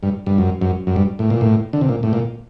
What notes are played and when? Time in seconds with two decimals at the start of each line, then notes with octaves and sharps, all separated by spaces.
0.03 G2
0.26 G2
0.38 F#2
0.61 F#2
0.87 F#2
0.96 G2
1.19 A2
1.30 A#2
1.41 A2
1.73 D3
1.81 C3
1.89 A#2
2.03 A2
2.13 A#2